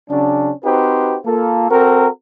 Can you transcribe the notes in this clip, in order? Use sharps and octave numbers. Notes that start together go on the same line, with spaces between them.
C#3 F#3 C#4 D4
C4 D#4 F#4 G4 B4 C5
A#3 F4 A4
C4 F#4 A4 A#4